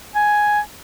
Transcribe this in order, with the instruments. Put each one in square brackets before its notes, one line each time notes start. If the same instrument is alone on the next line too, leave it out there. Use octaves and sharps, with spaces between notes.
[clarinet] G#5